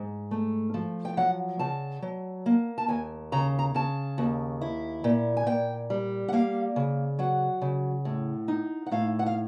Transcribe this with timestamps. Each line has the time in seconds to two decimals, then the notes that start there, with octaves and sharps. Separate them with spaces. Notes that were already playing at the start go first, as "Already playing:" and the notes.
Already playing: G#2
0.31 A3
0.74 F3
1.05 G5
1.17 F#3 F#5
1.59 C#3 A5
2.02 F#3
2.46 A#3
2.78 A5
2.88 D#2 G#5
3.32 C#3 A#5
3.59 A#5
3.74 C#3 A5
4.18 D#2
4.61 E4
5.04 A#2
5.37 G#5
5.46 A#2 G5
5.90 G3
6.28 F#5
6.33 A#3 F5
6.76 C#3
7.19 F#3 F#5
7.62 C#3
8.05 A2
8.48 D#4
8.86 F#5
8.92 A2 F5
9.19 F#5
9.26 F5